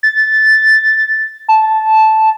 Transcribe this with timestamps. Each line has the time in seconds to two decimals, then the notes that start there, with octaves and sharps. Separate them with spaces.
0.03 A6
1.48 A5